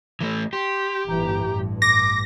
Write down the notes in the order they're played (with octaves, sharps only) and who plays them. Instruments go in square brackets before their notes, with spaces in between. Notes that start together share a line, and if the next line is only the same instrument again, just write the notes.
[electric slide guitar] E3 A3
[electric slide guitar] G4 [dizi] C6
[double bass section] G1 A2 E3 [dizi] A#5
[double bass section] A1 G2
[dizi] D6 [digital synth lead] A#6